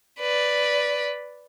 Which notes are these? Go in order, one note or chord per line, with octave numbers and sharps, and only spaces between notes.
B4 D5